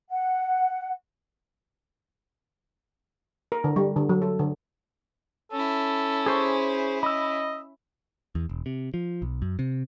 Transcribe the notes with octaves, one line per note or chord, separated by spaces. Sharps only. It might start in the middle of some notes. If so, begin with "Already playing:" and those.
F#5
A#4
D3
G3
D3
F#3
A4
D3
C#4 E4 A4
G#4 C5 C#6
D#5 B5 E6
E2
E1
C3
F3
B1
F#2
C3